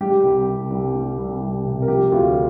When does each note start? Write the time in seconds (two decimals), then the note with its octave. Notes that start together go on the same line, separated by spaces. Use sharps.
0.01 G3 G4
0.23 C2
0.47 C2
0.70 C2
0.94 G3
1.18 C2
1.41 C2
1.66 C3
1.82 A#4
1.88 F3 G4
2.12 D2 F4